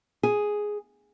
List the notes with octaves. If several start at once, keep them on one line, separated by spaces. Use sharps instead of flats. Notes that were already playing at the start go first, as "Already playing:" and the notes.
G#4